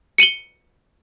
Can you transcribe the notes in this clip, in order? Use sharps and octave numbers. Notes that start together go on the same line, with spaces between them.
C#7 D#7 F#7 G7